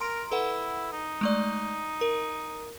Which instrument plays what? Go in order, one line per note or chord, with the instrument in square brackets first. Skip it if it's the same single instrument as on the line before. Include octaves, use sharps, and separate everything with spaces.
[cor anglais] A#4 [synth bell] A#5 C6 D7
[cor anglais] E4 [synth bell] A4 B4 F#5
[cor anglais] D#4
[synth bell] G#3 A3 D5
A#4